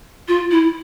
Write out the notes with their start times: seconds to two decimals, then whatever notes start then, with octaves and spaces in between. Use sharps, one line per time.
0.28 F4
0.51 E4